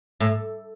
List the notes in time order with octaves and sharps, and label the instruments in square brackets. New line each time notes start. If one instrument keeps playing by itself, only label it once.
[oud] A2